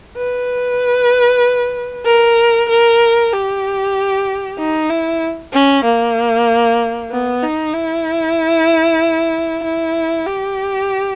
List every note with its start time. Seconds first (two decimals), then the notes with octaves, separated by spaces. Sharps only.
0.17 B4
2.06 A#4
2.69 A#4
3.33 G4
4.58 D#4
4.90 E4
5.53 C#4
5.85 A#3
7.11 B3
7.43 D#4
7.74 E4
9.64 E4
10.26 G4